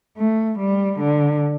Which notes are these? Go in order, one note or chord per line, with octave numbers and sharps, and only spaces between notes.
A3
G3
D3